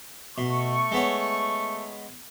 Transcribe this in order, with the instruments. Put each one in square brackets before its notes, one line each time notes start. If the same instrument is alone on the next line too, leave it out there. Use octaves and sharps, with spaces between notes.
[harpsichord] B2 [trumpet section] A3 C#6
[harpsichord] G#3 B3 C#5